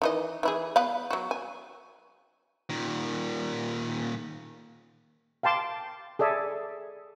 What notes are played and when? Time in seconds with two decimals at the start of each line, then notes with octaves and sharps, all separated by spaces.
0.02 D#3 E3 D#5
0.43 E3 E4 G#4
0.76 B3 B4 F5
1.11 F#3 F#4
1.31 G#5
2.70 A#2 D#3
5.43 F5 G5 A5 C6 D6
6.19 G#4 A4 D5 E5 G#5